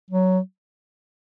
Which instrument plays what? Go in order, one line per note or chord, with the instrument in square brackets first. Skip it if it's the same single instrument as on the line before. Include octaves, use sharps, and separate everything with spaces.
[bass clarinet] F#3